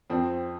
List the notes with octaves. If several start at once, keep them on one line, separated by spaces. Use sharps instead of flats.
F2 C4